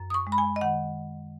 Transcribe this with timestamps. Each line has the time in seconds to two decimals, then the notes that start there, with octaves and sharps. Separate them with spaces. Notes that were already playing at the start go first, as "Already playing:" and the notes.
Already playing: F#2
0.10 D#6
0.14 C#6
0.27 G#3
0.32 B5
0.38 G#5
0.56 D#5
0.61 D#3 F#5